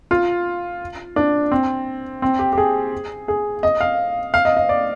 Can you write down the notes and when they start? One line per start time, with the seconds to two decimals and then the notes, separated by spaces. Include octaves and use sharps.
0.11 F4
1.16 D4
1.51 C4
2.22 C4
2.39 G4
2.53 G4
2.58 G#4
3.28 G#4
3.63 D#5
3.81 F5
4.34 F5
4.45 D#5
4.57 D#5
4.69 D5